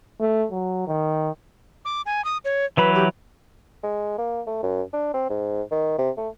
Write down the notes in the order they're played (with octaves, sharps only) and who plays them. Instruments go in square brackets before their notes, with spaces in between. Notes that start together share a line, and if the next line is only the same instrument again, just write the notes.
[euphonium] A3
F#3
D#3
[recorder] D6
G#5
D#6
C#5
[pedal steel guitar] E3 F#3 B5 [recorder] B4
[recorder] G4
[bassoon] G#3
A#3
A3
F#2
D4
C4
G#2
D#3
C3
A3